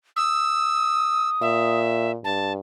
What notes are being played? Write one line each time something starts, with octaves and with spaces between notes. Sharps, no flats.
D#6 E6
A#2 E5
G2 A5